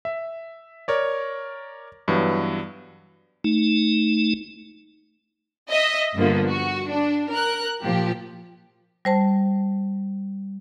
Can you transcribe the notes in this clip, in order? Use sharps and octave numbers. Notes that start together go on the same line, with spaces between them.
E5
A#4 C#5 D5
G2 E3 F#3 B3
A3 D#4
D#5 E5
G2 D3 F3 A#3 B3
F#4
D4
A#4 F#6
A#2 F3 G4
G3 C5 A5